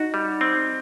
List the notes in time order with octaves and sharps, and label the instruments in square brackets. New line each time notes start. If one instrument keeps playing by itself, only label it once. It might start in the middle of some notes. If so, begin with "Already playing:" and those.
Already playing: [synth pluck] D#4 [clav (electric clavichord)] F#4
[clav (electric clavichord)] G3
C4